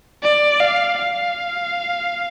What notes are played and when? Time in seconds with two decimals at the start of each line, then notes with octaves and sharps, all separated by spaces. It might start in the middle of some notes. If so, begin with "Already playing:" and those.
0.23 D5
0.60 F5
0.99 F5